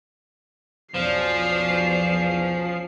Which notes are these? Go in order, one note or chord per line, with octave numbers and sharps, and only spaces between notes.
B1 E2 F3 C#4 D5 C7